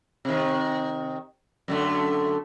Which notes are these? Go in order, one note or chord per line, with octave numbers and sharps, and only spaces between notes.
C3 D#3
F#2 D3 A3